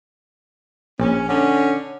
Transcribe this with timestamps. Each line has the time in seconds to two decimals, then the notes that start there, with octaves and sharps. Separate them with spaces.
1.00 A#1 C#4
1.27 D3 C#4